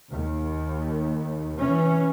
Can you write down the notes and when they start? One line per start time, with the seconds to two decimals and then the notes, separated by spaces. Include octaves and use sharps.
0.11 D#2
1.59 E3 C#4